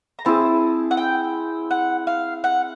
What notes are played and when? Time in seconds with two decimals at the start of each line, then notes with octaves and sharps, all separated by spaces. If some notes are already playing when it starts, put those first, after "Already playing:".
0.19 A#5
0.25 C4 E4 G#4 A5
0.91 F#5
0.97 G5
1.71 F#5
2.07 F5
2.44 F#5